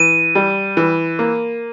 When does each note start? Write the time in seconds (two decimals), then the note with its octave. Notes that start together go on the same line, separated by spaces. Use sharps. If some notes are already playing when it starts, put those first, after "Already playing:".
Already playing: E3 D#7
0.35 G3
0.77 E3
1.19 A#3